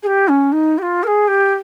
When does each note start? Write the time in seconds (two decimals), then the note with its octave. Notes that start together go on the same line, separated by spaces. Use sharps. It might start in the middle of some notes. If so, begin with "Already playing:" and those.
0.02 G#4
0.06 G4
0.28 C#4
0.52 D#4
0.78 G4
0.82 F4
1.03 A#4
1.07 G#4
1.27 G4